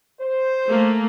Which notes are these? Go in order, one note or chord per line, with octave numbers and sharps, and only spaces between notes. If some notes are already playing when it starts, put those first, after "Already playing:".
C5
A3 A#3